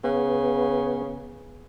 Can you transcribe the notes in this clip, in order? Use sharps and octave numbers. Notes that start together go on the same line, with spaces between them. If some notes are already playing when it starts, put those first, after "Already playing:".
C#3 B3